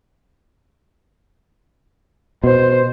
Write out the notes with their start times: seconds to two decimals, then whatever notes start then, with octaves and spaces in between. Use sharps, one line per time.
2.44 B2 C5